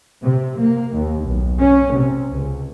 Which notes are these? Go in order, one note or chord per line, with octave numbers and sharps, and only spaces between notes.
C3
A#3
D#2
B1
C#4
C3
C#2